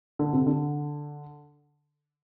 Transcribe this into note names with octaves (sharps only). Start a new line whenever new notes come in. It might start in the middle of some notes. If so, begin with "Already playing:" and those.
D3
C3
D3